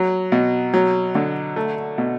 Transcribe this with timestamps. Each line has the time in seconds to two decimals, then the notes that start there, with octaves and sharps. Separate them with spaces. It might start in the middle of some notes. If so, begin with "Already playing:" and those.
Already playing: F#3
0.32 B2
0.74 F#3
1.15 D3
1.56 A3
1.98 B2